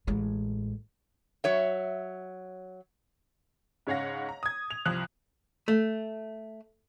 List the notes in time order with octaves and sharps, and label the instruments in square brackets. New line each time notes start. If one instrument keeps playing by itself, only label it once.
[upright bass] A1 G#3
[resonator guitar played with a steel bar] F#3 C#5 E5
[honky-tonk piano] G#2 C#3 C#5 F5 F#5 A#6
A#5
D#6 G#6
F7
C2 F3 D#6 F#6 F7 F#7
[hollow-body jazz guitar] A3